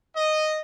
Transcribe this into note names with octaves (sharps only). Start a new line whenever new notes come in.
D#5